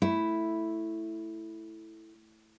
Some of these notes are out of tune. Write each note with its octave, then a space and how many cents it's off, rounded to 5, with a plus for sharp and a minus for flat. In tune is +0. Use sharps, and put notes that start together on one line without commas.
A3 +0 E4 +0